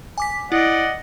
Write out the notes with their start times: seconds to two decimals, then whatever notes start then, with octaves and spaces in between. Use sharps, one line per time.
0.18 G#5 D6 B6
0.52 E4 D5 D#5 F#5